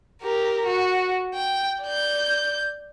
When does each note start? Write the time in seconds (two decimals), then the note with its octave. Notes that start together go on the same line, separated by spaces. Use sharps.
0.22 G4 A#4
0.66 F#4
1.34 G5
1.83 D5 G6